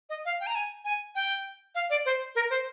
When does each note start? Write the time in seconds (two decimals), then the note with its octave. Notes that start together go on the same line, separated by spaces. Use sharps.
0.10 D#5
0.25 F5
0.40 G5
0.47 A#5
0.55 G#5
0.85 G#5
1.15 G5
1.75 F5
1.90 D5
2.06 C5
2.35 A#4
2.50 C5